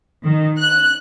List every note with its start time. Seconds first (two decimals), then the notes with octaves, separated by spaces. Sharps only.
0.23 D#3
0.61 F#6